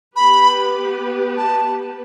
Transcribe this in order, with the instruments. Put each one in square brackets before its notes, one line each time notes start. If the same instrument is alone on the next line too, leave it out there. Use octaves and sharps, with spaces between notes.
[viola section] B3 G4 B4 [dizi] B5
[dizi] A5